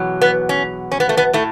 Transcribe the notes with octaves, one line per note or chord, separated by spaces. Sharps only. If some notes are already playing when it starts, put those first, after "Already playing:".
Already playing: E2 B2 F#3
B3
C#4
C#4
B3
A3
B3
A2 A3